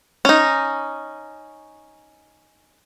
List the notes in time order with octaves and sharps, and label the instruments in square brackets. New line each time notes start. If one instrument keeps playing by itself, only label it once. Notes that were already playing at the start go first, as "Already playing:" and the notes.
[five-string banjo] C#4 D#4